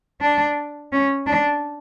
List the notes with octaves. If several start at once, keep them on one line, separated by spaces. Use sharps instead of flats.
D4
C#4
D4